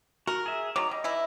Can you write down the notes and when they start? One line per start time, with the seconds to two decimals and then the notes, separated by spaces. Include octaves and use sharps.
0.27 F#4 A#4
0.46 G#4 E5
0.76 D#3 F#3 A#5 D6
0.91 G3 D#5
1.04 E3 E4